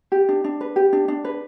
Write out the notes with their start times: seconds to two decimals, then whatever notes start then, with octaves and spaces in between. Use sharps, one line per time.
0.12 G4
0.29 D4
0.44 D4
0.61 B4
0.76 G4
0.93 D4
1.08 D4
1.25 B4